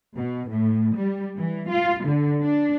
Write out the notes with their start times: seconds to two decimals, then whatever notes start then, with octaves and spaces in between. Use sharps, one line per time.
0.18 B2
0.52 A2
0.98 G3
1.38 E3
1.71 F4
2.07 D3
2.43 D4